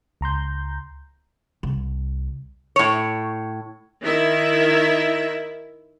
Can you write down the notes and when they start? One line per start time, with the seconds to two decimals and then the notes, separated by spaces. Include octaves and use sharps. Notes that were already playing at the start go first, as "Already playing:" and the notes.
0.21 C#2 A#5 C6 G6
1.63 C2
2.76 A2 C#5
4.02 D#3 E4 E5